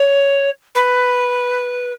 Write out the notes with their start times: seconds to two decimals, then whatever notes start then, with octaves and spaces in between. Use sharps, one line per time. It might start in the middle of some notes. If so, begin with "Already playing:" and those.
Already playing: C#5
0.75 B4